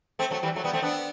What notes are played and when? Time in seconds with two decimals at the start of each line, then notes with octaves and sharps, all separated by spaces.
0.19 A3 C4
0.31 F#3 A3
0.43 E3 G3
0.56 F#3 A3
0.64 G3 B3
0.73 A3 C4
0.82 B3 D4